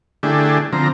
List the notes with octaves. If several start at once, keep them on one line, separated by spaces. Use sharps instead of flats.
D3 A3 D4 E4 G4 G#4
D3 F3 C4 A#5